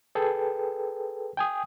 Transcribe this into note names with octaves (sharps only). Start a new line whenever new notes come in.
G#4 A4 B4 G5
G5 G#5 D#6